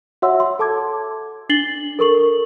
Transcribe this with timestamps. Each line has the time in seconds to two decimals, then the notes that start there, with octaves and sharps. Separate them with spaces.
0.22 F#4 C#5 E5 F#5 C6 E6
0.40 C6
0.59 A4 A5 D6 G#6
1.49 D4 A6 C7 F#7 G7
1.99 A4 A#4 C#6 F#7